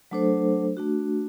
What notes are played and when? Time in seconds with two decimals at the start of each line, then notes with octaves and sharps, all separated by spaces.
0.11 F#3 A3 D4 A4 C5
0.77 A3 D4 F#4